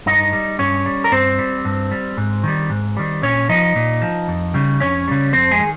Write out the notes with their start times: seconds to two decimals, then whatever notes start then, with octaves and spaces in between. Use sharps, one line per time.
0.06 G2 D#4 D#5
0.33 G3
0.59 G2 C#4 C#5
0.86 G3
1.04 A#4
1.12 G2 C4 C5
1.39 G3
1.65 G2
1.91 G3
2.17 G#2
2.44 D#3 G3
2.70 G#2
2.97 D#3 G3
3.22 A#2 C#4 C#5
3.49 F3 D#4 D#5
3.75 A#2
4.02 F3
4.28 F2
4.54 C#3 G3
4.80 F2 C#4 C#5
5.08 C#3 G3
5.33 F2 C4 C5
5.51 G#3 G#4
5.60 D#3